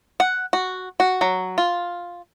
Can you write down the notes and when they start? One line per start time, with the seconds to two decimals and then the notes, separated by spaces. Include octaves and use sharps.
0.20 F#5
0.53 F#4
1.00 F#4
1.21 F#3
1.58 F4